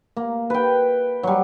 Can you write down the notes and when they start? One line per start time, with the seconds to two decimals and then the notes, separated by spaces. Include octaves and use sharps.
0.17 A#3
0.50 B4 G5
1.23 F#3 G3